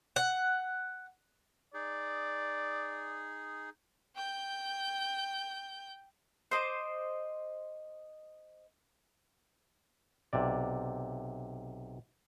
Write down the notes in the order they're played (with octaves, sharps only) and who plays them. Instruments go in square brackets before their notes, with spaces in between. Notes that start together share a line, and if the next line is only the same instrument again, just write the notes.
[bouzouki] F#5
[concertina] D#4 G#4 [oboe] D5
[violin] G5 G6
[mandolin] C5 D#5 D6
[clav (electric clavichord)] B1 C3 D5